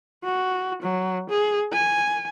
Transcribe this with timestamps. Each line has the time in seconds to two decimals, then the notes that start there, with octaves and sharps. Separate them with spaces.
0.24 F#4
0.83 F#3
1.30 G#4
1.72 G#5